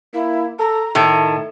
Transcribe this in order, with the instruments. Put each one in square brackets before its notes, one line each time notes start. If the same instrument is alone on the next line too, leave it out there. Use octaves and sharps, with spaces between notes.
[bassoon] A#3 [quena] E4
[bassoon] A4 [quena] A#5
[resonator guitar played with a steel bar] A2 D#3 [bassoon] A3 [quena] A5